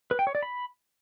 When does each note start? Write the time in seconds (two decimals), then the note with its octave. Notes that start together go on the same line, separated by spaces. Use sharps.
0.11 B4
0.19 G5
0.27 C#5
0.35 D5
0.43 B5